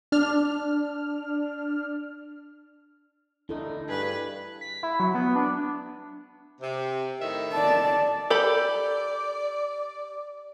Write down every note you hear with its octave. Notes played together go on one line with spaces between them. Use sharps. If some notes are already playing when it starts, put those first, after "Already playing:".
D4 F6
D3 D#4 E4 A4
G2 G#4 B4
B6
E4
F#3
B3
D4
C3
A2 D#3 E5
D5 A5
G4 A4 D5 B5